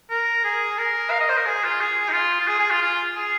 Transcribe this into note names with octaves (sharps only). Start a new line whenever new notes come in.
A#4
G#4
A#4
F5
D#5
C5
A#4
G#4
F4
G#4
D#4
F4
F4
G#4
G#4
F4
F4
G#4